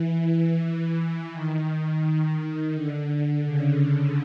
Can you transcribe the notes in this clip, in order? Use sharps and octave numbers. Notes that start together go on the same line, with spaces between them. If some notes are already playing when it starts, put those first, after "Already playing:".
Already playing: E3
D#3
D3
C#3